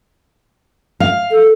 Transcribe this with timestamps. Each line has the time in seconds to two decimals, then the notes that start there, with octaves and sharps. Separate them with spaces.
1.00 F5
1.31 A4